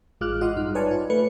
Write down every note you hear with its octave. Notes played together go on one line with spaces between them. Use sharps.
A1 G#3 F4 D6 F6 F#6
F4 D#5 F#5 C6 D#6
G2 D#4 F6
B4 C#5 D5 G#5 A5 C#6
F4
A3 B4 C#7